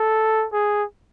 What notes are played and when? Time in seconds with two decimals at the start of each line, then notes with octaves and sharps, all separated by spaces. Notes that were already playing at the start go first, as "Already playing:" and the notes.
Already playing: A4
0.53 G#4